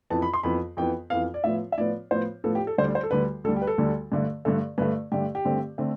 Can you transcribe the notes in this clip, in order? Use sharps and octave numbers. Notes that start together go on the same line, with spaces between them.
F2 E3 B3 A5
B5
C6
F2 E3 B3 B5
F2 E3 B3 G5
F2 E3 B3 F5
D5
A2 F3 B3 E5
E5
A2 F3 B3 D5
A2 F3 B3 C5
A2 F3 B3 A4
G4
A4
D2 D3 G3 C5
D5
C5
A4
D2 D3 G3 B4
D2 D3 G3 A4
G4
B4
A4
D2 D3 G3
G2 D3 A3
G2 D3 A3 A4
G2 D3 A3 B4
G2 D3 A3 G4
G4
G2 D3 A3 C4
D3 A3 C4